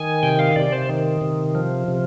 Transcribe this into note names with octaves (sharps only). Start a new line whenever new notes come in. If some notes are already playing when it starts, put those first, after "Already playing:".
Already playing: D#3 G#5
C3 G5
F5
C3 D5
C5
D#3
C3
F3
C3